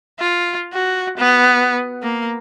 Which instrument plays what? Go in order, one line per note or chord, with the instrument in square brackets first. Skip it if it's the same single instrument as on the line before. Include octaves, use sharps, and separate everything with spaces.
[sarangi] F4
F#4
B3
A#3